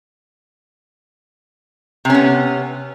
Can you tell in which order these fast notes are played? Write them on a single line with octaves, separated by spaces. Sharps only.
C3 C#4 B3